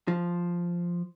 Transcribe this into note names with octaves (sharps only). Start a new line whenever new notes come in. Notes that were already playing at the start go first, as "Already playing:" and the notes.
F3